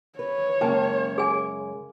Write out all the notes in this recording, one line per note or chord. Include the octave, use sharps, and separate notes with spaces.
B4 C#5
F#2 C#3 G#3 A#3 G5 A5
G#4 G#5